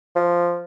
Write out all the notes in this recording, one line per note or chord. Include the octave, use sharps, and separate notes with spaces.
F3